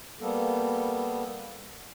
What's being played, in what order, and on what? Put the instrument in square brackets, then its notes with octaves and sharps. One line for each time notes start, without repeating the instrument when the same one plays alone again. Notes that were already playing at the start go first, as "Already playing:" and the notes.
[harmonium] G3 A#3 B3 A4